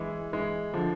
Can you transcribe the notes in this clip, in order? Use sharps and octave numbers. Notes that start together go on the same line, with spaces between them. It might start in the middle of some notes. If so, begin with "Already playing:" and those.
Already playing: E3 G#3
E3 G#3
D3 F3